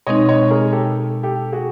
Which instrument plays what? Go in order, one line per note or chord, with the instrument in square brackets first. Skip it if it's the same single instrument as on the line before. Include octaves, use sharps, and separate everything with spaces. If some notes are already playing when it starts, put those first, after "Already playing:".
[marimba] B2 G#3 C4 D#4 [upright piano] C#5 D#5
[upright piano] C#5 D#5
G#4 A#4
G4 A4
G4 A4
F#4 G#4